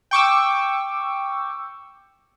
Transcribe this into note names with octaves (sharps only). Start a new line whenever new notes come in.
G5 C#6 D6 E6